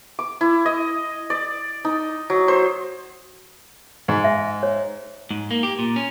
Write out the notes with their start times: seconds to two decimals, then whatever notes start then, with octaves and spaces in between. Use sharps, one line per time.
0.19 D6
0.41 E4
0.66 D#5
1.30 D5
1.85 D#4
2.30 F#3
2.48 C5
4.08 G#2
4.24 E5
4.63 C#5
5.31 G#2
5.51 A#3
5.63 G4
5.79 A#2
5.96 C#4